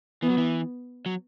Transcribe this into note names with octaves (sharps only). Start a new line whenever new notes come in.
E3 B3
F#3
E3
F#3